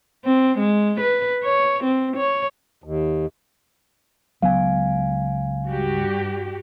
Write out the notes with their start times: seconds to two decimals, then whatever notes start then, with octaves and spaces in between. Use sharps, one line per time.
0.25 C4
0.58 G#3
1.00 B4
1.43 C#5
1.84 C4
2.17 C#5
2.84 D#2
4.42 C#2 F#3 B3 F5 G#5
5.66 G2 F#4 G4